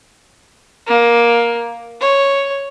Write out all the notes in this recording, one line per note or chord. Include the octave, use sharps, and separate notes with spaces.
A#3
C#5